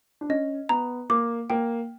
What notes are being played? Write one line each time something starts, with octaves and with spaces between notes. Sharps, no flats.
D4
C#4 D#5
B3 A#5
A#3 D6
A#3 G5